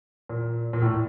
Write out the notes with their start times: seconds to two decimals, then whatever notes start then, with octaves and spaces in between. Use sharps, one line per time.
0.29 A#2
0.73 A#2
0.82 A2